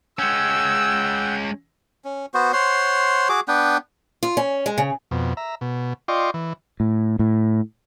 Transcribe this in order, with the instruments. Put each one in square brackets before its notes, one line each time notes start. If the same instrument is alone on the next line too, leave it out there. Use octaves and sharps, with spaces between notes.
[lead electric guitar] G#3 C#4 [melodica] F#5 G5 [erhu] E6
[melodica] C#4
B3 F#4 C5
C5 C#5 F#5 C6
F#4 G#4 D6
B3 D4 B4 G5
[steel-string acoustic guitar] F4
C#4
G#3
C#3
[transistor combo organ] F2 B2
E5 A#5
B2
F4 D5 D#5 G5 C6 C#6
E3
[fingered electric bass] A2
A2